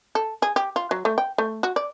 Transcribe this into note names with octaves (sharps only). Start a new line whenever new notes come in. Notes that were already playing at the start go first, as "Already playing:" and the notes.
A4
G#4
G4
F4
F#3
A3
G5
A3
F#4
D5